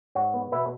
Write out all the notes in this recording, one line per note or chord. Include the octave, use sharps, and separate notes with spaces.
G#2 C#5 F#5
B3
B2 B4 E5